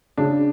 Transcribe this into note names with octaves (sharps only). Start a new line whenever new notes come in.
C#3 D4